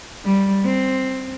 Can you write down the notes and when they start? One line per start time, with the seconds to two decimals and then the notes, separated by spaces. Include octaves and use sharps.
0.25 G3
0.65 C4